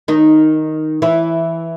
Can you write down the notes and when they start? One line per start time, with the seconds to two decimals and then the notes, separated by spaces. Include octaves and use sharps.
0.08 D#3 D#4
1.02 E3 E4